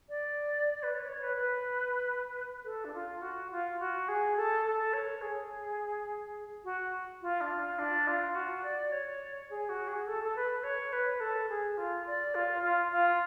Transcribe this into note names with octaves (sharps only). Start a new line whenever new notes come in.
D5
B4
C#5
D5
C#5
B4
B4
A4
D4
F4
F#4
F4
F#4
G#4
A4
A4
C#5
G#4
F#4
F4
D4
F4
D4
F4
F#4
D5
C#5
G#4
F#4
G#4
A4
A4
B4
C#5
B4
A4
G#4
F4
D5
F4
F4
F4